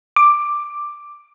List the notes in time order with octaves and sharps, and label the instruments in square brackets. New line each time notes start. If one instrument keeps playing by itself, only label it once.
[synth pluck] D6